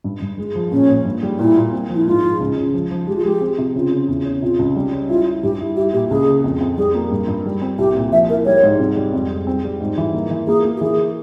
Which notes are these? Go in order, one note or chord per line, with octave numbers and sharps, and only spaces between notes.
G2
G2
G#3
F3
A#2 C#4
A#2
G2
G3
A#2 E4
A#2
C4
F3
E4
G#2 F4
G#3
C#2
C#3
F3
F3
G#3 G4
F4
G#3 G4
C4
C3
C#3 F4
C#3
E2
C#4
C3 F4
C#2
G3
C#4
E4 F4
E4
G2 G4
E4
E4 G4
A#2 G4
C#2 G#4
C#3
F2
F2
G3 G#4
A#3
G2
G2
G3
C4
C2 G4
A#2
F3 E5
E4 A#4
G3 C#5
G#2
C3
G3
F2
G#3
C4
G3
G#2
E3
A#3
E3
A#3 G#4
A#3
G4
E3 G#4